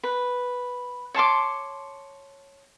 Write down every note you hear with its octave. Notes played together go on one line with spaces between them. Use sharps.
B4
C#5 A5 C6 D6